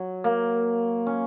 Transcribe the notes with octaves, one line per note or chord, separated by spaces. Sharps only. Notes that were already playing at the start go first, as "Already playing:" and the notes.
Already playing: F#3
A#3
C#4